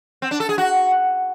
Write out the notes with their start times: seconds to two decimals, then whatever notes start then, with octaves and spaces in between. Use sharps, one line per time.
0.22 C4
0.31 D4
0.40 A4
0.49 G#4
0.58 F#4